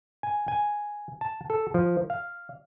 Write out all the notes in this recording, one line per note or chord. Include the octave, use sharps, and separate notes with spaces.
G#5
G#5
A5
A4
F3
F5